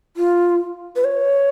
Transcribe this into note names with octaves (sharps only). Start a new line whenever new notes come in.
F4
B4
C#5